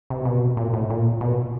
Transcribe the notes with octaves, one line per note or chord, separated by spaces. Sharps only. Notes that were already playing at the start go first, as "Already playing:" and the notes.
C3
B2
A#2
A2
A#2
B2